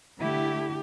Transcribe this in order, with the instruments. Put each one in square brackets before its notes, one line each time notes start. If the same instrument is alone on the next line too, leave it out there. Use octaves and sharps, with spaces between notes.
[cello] D3 G4 [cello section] A3 E4